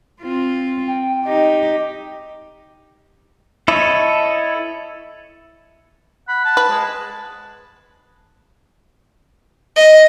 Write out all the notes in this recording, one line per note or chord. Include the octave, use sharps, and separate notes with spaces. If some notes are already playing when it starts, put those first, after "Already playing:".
C4 F4
G5
D#4 G4 D#5
E4 A4 C#5 D#5
F#5 B5
A5
B4
G#3
D#5